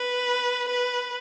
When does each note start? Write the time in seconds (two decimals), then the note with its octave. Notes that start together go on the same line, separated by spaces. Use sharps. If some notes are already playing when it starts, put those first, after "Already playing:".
Already playing: B4
0.69 B4